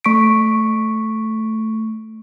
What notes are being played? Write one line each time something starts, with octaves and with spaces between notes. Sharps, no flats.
A3 C#6 B6 D7